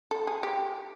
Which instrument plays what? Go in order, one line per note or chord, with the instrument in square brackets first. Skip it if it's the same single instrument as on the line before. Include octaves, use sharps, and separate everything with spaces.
[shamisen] A4
G#4
G4